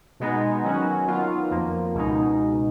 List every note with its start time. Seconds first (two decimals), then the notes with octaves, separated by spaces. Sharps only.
0.20 B2 G#3 B3 D#4
0.63 D#3 F#3 C#4 F#4
1.07 D#3 F#3 B3 F4
1.51 F2 F3 A#3
1.94 C#2 B2 G#3 D#4